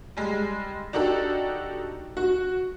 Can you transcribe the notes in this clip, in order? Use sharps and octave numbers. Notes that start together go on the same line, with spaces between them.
G3 G#3
D4 D#4 F#4 G4 A4
F#4